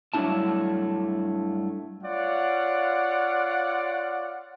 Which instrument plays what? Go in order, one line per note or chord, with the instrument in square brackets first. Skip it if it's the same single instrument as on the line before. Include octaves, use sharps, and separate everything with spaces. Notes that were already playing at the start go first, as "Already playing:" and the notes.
[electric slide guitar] G2 F#3 A3 D4 E4 A5
[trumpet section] F4 C#5 D5 F5 F#5